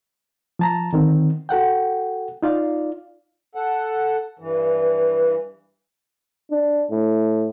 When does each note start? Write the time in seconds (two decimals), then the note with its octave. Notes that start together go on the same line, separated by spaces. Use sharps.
0.59 F3 A5 A#5
0.93 D3 D#3 C4
1.49 F#4 A4 F#5 G5
2.43 D#4 F4 D5 F5
3.55 A4 F#5
4.39 G2 E3
6.51 D4
6.91 A2